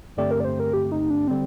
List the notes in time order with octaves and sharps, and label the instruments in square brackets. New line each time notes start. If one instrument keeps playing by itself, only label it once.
[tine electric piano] G2 D3 A3 C4 G4 [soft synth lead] D5
[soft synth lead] A#4
D5
C5
A#4
G4
D#4
D4
[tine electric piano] D3 G3 [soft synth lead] C4